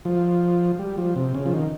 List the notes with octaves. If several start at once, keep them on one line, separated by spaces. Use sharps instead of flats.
F3
G3
F3
C3
C#3
F3
D#3